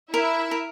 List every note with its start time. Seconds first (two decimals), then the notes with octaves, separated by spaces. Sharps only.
0.13 E4 A#4 E5
0.51 A#4